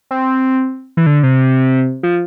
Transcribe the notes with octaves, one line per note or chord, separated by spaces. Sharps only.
C4
E3
D3
C3
F3